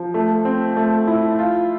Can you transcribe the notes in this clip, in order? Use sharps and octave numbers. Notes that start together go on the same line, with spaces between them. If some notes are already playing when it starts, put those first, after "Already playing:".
Already playing: F3
A3
C4
A3
E4
F4